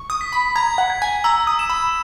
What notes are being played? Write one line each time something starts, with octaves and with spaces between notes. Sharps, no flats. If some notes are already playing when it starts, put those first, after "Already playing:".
Already playing: C#6
D#6
B6
B5
A#5 G#6
F#5
G#6
G#5
A#5 E6
D#6
E7
B5